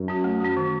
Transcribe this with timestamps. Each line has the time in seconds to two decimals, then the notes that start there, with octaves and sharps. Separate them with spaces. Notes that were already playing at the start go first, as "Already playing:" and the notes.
Already playing: F#2
0.08 C#4 F#4
0.24 A3
0.40 C#4 F#4
0.57 D#3